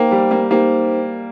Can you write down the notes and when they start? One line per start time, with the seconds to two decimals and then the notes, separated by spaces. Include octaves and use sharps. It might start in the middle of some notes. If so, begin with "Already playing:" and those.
Already playing: A#3 D#4 G4 C5 G5
0.11 G3
0.31 A#3
0.51 A#3 D#4 G4 C5 G5